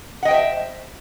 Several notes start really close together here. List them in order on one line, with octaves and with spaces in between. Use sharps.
F#5 D#5 G5 C5 E5